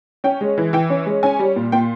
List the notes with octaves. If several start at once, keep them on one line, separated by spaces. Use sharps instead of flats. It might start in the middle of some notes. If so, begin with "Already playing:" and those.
C#4 G5
G#3
E3
E3 G5
C#4
G#3
C#4 G#5
G3
A#2
A#2 G5